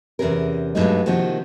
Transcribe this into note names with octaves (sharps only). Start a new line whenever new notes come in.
E2 C3 F#3 C#4 G#4 A#4
G2 B2 F#3 G#3 A3 D#4
C3 D#3 F3 A#3 C4 F#4